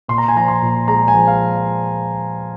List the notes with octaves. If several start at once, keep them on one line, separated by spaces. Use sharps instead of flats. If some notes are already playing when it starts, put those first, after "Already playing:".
A#2 C6
A#5
G#5
F3 A#5
C6
A#2
G#3 A#5
G#5
F3
F5